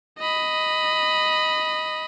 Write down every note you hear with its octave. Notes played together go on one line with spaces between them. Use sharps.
D#5 B5